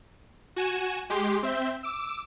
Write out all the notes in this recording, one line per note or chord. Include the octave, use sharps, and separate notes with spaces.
F#4 G#5 E7
G#3 G4 C6
C4 E5 G6
D6 E6